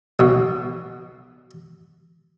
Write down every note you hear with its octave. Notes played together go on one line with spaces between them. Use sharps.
B1 B2